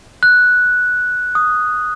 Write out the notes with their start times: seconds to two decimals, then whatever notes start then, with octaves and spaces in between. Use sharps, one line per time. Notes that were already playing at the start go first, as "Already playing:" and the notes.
0.23 F#6
1.35 D#6